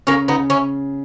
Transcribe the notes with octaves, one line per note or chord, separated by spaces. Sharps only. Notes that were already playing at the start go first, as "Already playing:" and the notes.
C#3 A#3 C#4
B3 D#4
C#3
C#4 E4